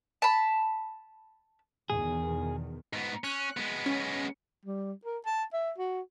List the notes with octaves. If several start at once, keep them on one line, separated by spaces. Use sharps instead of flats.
A5 B5
E2 B2 D#3 G#4
G#2 B3
C#4 F#6
G#3 B3
C#4
G3
A#4
A5
E5
F#4